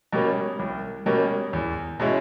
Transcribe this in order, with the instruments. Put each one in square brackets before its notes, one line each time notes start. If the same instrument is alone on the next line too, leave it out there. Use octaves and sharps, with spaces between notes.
[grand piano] B2 G3 A#3 C#4
C2
B2 G3 A#3 C#4
E2
B2 G#3 C#4 E4